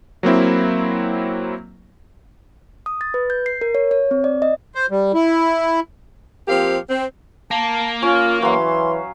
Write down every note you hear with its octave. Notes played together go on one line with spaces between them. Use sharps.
F#3 A#3 C4 E4
D#6
A6
B4
G6
C7
A#4
C#5
C#5
C4
D5
D#5
C5
G3
E4
F3 A#3 C4 G4 F5
C4
A#3 A5
C#4 F4
E3 F#3 F5 C6